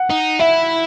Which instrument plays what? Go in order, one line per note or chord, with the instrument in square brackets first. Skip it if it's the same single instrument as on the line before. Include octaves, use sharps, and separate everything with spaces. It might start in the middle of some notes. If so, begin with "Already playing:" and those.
Already playing: [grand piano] F#5
[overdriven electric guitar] D#4
[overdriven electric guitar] E4 [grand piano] E5